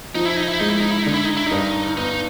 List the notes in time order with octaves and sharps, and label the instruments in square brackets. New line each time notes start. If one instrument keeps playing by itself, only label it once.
[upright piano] F3 [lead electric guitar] D#4
[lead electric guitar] E4
D#4
E4
[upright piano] G#3 [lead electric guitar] D#4
[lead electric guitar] E4
D#4
E4
[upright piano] D3 [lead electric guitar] D#4
[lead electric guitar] E4
D#4
E4
[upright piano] G2 [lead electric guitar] D#4
[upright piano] B3 [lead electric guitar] D#4